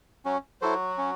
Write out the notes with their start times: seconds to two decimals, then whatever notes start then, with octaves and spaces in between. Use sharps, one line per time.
0.25 F#3 C#4 F#4
0.61 F#3 E4 F#4 A4 C5
0.98 C#4